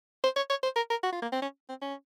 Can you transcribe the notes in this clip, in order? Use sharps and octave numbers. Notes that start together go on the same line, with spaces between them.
C5
C#5
C#5
C5
A#4
A#4
F#4
F4
A#3
C4
C#4
C4
C#4